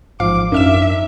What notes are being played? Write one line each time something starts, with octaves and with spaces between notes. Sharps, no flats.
A1 G#2 F3 F5 D6
F#2 D4 D#4 E5 F6 E7